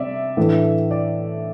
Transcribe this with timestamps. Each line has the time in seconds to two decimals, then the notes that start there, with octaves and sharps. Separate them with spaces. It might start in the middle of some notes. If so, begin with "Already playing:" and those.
Already playing: C3 G3 C4 D5 E5
0.37 A2 E3 A3 D4
0.91 D5